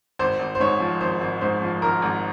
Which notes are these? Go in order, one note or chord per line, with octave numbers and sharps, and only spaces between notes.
G#1 C5
G#1
C5
G#2 C#5
F3
G#1 C5
G#1
G#2 C5
F3
G#1 A#4
G#1